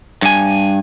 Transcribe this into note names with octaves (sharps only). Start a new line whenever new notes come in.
G2 G#5